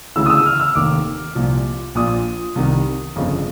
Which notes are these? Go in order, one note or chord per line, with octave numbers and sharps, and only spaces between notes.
D2 C#3 E3 E6
D#6
E6
F6
E6
F1 D#2 D#3 D6
C2 A#2 F3
A#1 A#2 F3 D#6
C2 C3 D#3
G1 F2 C#3